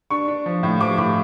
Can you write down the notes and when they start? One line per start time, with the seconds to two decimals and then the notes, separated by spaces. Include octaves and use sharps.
0.10 D4 C#6
0.28 D4
0.46 F3
0.63 A2
0.81 F3 D6
0.98 A2 D6